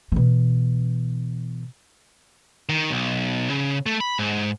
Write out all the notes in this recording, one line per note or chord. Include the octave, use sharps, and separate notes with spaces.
B2 E3
D#3
B1
C#3
A3
B5
G#2